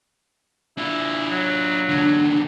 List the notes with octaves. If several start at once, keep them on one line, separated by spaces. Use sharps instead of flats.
D4 E4 F4
F#3
E2 D3 D4